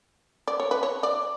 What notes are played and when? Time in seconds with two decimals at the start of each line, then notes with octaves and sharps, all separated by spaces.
0.48 D5
0.60 C#5
0.71 B4
0.83 C#5
1.03 D5